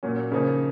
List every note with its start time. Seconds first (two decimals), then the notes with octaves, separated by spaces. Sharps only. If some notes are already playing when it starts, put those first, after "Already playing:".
0.03 A#2 F#3 A#3 C#4
0.32 C#3 F3 A#3 D#4